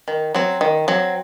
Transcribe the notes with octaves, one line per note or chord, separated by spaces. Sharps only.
D#3
F#3 C4
D#3
F#3 C4